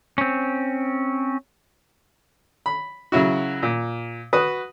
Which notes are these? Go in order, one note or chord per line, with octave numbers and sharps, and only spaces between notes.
C4 C#4
B5
C#3 F#3 E4 F#4
A#2
F#4 B4 D#6